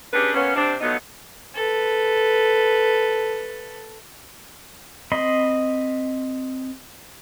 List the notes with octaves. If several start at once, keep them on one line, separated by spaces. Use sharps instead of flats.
C#4 D4 G4 G#4 B4
A#3 B3 C#4
C3 C4 D4
F3 F#3 A3 B3 D#4
A4 B4
C4 D#5 B5 C6